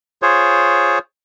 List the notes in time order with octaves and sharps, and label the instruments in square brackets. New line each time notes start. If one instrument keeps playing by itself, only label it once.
[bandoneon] F4 G#4 C5 C#5